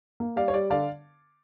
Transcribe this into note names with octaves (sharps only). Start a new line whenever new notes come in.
A#3
G3 D5 F5
C#5
G3 D5
D3 D5 F5